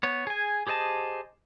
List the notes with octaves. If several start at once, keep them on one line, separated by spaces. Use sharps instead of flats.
B3 C#5
G#4 G#5
G4 G#4 C5 D#5 A5